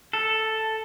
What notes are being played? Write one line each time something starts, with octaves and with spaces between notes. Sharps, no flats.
A4